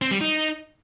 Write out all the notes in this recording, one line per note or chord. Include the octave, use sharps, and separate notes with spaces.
C4
G3
D#4